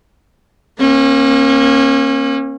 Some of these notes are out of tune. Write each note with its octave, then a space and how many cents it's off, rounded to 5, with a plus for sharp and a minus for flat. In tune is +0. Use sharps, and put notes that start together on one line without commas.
A#3 +15 C#4 -35